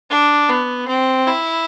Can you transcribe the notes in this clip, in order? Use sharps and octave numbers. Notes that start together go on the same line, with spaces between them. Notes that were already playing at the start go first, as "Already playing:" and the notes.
D4
B3
C4
E4